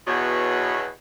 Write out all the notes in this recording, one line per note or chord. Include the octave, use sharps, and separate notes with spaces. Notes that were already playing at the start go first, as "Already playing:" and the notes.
E2 B2 F#3 B3 C#5